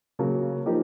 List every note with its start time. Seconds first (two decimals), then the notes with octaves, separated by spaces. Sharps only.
0.19 C#3 F#3 A#3
0.66 F3 A#3 D#4 G4